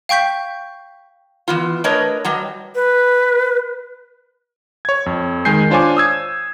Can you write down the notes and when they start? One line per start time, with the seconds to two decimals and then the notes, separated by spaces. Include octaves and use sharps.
0.09 F5 G5 C#6 G6 B6
1.48 E3 B3 F4
1.84 A3 D4 A#4 B4 C#5 D#5
2.25 F#3 G3 D#5
2.75 B4
4.85 C#5 G#6
5.06 F2
5.45 D#3 G#3 G#5 G6 C7
5.70 D4 F4 C5 C#5 G#5 D6
5.97 D#6 E6 G#6